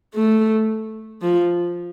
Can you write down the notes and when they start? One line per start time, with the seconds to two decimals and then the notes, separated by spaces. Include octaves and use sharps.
0.14 A3
1.22 F3